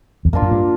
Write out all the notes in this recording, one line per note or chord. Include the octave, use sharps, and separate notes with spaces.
E2
F2 A#3 D4 F4
F#2
G2